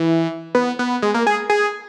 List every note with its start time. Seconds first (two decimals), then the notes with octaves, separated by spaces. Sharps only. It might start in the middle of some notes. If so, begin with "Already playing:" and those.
Already playing: E3
0.55 B3
0.79 B3
1.02 G#3
1.14 A#3
1.27 G#4
1.50 G#4